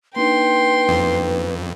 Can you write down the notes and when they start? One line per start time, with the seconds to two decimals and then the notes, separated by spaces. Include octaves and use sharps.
0.16 A#3 D4 D#4 B4 G5 C6
0.88 F2